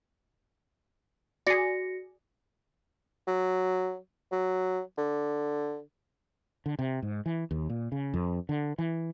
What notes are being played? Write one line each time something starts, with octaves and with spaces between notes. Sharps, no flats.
F#4 G#4 D5 A#6 C#7
F#3
F#3
D3
D3
C3
G#2
E3
D#2
A#2
C#3
F2
D3
E3